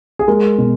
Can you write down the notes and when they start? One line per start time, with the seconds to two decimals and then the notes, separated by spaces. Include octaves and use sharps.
0.19 G#4
0.28 G#3 A#4
0.58 B2